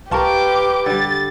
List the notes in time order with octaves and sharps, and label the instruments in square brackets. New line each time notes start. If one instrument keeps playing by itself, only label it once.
[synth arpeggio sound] C2 A5 C#6 [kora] F4 A#4 [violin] G4 D6 [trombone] B4
[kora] D3 G3 [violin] A6